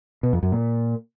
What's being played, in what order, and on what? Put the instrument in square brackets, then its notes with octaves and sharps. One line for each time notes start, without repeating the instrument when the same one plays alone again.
[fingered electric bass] B2
F2
F#2
A#2